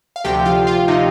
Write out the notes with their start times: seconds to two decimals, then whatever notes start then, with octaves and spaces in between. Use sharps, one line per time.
0.16 F5
0.24 D2 C3 F3 G4 G5
0.45 F4 F5
0.67 F4 F5
0.88 C3 F3 D#4 D#5